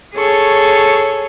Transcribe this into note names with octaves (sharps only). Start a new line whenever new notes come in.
G#4 A4 C#5 C#6